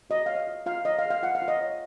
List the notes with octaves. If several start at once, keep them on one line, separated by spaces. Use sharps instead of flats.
F#4 D#5
C#5 F5
D#5
F4
F4 F5
C#5 D#5
F5
G#4
F5
F4 F#5
F5
F4
D#5
C#5